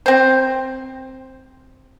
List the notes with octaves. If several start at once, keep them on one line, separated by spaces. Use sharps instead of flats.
C4 C5